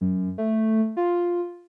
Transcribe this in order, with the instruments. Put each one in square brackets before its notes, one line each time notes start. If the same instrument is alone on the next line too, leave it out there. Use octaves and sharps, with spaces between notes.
[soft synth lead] F#2
A3
F4